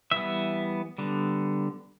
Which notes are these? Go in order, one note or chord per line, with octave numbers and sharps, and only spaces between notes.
E3 G3 B3 E5
D3 G3 B3